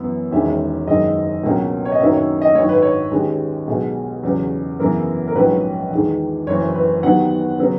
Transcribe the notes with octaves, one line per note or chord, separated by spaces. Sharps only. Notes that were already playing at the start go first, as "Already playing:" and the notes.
Already playing: F#2 E3 B3
E1 E2 D#3 G#3 C#4 E5
F#1 F#2 D#3 G#3 D#5
C#2 B2 F#3 A#3 C#4
C#5
D#5
F#2 D#3 F#3 A#3 C#4 E5
C#5
D#5
G#1 F#2 D#3 C#5
B4
C#5
D#2 D#3 G#3 C#4
B1 B2 G#3
E2 C#3 F#3 C#4
F#2 C#3 E3 B3 A#4
A#4
A#1 G#2 F#3 C#4 B4
E2 D#3 G#3
F#1 F#2 E3 C#5
B4
D#2 D#3 F#3 B3 F#5
C#3 F#3 B3